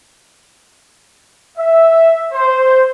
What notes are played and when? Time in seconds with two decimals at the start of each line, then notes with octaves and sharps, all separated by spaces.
1.58 E5
2.33 C5